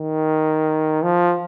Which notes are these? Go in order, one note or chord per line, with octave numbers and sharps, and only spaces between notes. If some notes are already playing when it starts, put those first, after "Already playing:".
Already playing: D#3
F3